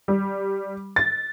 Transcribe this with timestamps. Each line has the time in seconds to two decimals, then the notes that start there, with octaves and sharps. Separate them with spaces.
0.08 G3
0.96 A6